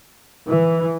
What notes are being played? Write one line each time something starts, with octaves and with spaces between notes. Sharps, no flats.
E3